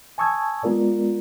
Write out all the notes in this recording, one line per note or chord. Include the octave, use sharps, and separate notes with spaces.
G#5 A5 C#6 D#6 E6 G#6
G#3 B3 F4 A#4 D5